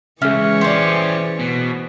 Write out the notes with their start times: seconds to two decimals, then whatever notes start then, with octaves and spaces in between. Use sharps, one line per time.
0.22 C#2 E3 C#4 G#4 C#5 E5
0.61 C#4 G4 C5 D5
1.39 B2